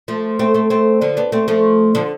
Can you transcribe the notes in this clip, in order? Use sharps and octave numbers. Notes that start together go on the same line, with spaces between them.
F3 A3
A3 C4
A3 C4
A3 C4
D3 F3
B3 D4
A3 C4
F3 A3
D3 F3